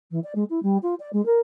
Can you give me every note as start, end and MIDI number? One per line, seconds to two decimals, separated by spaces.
0.11 0.19 52
0.23 0.32 74
0.35 0.44 56
0.49 0.59 64
0.62 0.77 55
0.82 0.94 65
0.99 1.09 74
1.12 1.23 56
1.25 1.39 70